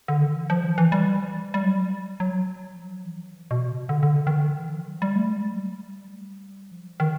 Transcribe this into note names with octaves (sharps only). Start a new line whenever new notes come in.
D3
D#3
E3
F3
E3
E3
G3
G3
F#3
F#3
F3
E3
B2
C3
D3
D3
C#3
D#3
D3
D#3
E3
F3
F#3
G3
A3
G#3
G3
F#3
G3
F3
D#3